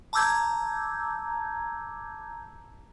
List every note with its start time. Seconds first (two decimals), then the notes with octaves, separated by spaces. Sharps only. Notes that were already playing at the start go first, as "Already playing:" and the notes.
0.13 A5 A#5 D6 E6 G6 G#6